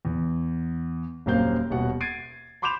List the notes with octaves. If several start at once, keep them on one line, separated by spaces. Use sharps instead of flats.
E2
D#1 F#2 A#3 C4 F5 G6
D#1 B2 F#5
G#6 A6 C7 D7 D#7
B5 C6 D6 G6 E7 F7